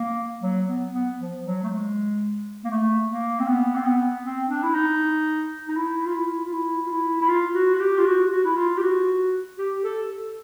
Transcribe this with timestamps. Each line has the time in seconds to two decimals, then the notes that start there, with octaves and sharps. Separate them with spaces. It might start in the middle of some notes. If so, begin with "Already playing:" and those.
Already playing: A#3
0.42 F#3
0.67 B3
0.92 B3
1.19 F3
1.44 F#3
1.63 A3
1.69 G#3
2.64 A#3
2.71 A3
3.10 A#3
3.40 C4
3.48 B3
3.76 C4
3.85 B3
4.23 C4
4.49 D4
4.63 E4
4.74 D#4
5.68 D#4
5.76 E4
6.06 F4
6.14 E4
6.45 F4
6.53 E4
6.87 F4
6.92 E4
7.21 E4
7.29 F4
7.55 F#4
7.75 F#4
7.80 G4
7.98 F4
8.05 F#4
8.31 F#4
8.44 E4
8.56 F4
8.77 G4
8.82 F#4
9.58 G4
9.84 A4
10.09 A4